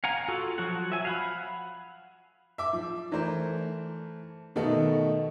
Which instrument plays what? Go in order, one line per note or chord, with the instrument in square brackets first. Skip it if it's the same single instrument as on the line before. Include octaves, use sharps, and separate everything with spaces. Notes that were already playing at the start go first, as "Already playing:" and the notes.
[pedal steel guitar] F5 F#5 G#5 A#5
F4 F#4 A4
F3 F#3 F#4 F#5
E5 G#5
F5 F#5 B5
[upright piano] E5 D6
F3
E3 A3 A#4 C5
B2 D#3 A3 B3 D#4 A4